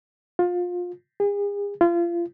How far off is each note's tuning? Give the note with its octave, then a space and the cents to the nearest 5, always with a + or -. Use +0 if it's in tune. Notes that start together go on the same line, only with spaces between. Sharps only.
F4 +25
G#4 -40
F4 -30